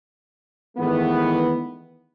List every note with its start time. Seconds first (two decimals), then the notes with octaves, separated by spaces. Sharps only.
0.78 G#2 D#3 E3 A3 B3